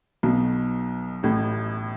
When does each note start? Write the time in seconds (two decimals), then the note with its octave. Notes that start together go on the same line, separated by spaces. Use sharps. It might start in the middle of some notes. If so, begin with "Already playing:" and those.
0.23 B1 B2
1.23 A1 A2